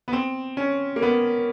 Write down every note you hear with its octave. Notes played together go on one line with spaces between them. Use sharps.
B3
C4
C#4
A#3
B3